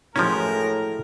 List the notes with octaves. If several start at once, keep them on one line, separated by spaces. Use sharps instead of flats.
A2 E3 F3 G#3 C#4 F#4 A#4